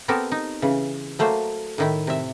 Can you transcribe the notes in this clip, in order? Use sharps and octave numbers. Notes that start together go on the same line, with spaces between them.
B3 C4 G4 A4 A#4
D#4
C#3 E3
F#3 A3 A#3 C5
A2 D#3 E4
C3 E5